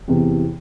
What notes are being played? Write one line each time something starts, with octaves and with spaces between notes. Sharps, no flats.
E2 C3 E3